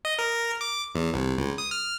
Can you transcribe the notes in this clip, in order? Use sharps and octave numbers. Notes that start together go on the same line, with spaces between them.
D#5
A#4
D6
E2
C2
C#2
D#6
F6